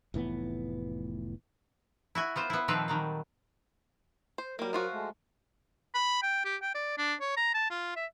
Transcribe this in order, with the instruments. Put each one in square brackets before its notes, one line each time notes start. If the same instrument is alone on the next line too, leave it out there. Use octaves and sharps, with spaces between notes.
[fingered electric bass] F1 A2 E3 B3
[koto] E4 F#4 G#5
B3 F4 C5
B3 E4
A#2 D#3 F3 C4 A4 B4
D#3 F#3 G3
[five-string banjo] C5
[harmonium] F#3 A#4 [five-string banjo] G3 A#3
[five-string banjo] F3 F4 F#4
[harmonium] G#3 A3
[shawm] B5
G5
G4
G5
D5
D4
C#5
A#5
A5
F4
E5